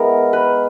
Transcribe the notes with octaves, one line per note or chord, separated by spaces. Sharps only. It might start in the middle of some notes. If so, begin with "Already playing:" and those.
Already playing: G#3 B3 E4 A#4
B4